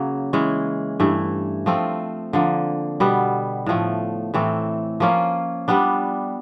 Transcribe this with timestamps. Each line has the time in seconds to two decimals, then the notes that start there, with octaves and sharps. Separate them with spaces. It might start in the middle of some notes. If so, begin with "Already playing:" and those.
Already playing: C#3 F#3 A#3
0.33 E3 G#3 C#4
1.00 G2 E3 A3
1.66 F3 A3 C4 F4
2.33 D3 F3 A#3
3.00 B2 G3 B3
3.66 A2 F3 A3
4.34 A2 E3 A3 C4
5.00 F3 A#3 C#4 F4
5.68 G3 B3 D4